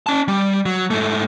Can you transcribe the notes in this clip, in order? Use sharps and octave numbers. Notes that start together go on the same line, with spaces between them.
C#4 A5
G3
F#3
G#2 A3